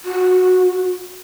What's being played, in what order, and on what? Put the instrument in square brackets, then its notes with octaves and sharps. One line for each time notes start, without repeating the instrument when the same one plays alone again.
[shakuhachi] F#4